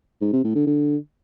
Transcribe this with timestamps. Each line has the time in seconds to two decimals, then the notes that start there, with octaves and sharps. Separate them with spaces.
0.21 G#2
0.32 C3
0.44 A2
0.55 D3
0.67 D3